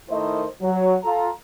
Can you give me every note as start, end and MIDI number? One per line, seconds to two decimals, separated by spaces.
0.10 0.45 51
0.10 0.45 57
0.10 0.45 64
0.10 0.45 70
0.10 0.45 72
0.10 0.45 75
0.62 0.96 54
1.04 1.29 65
1.04 1.29 69
1.04 1.29 82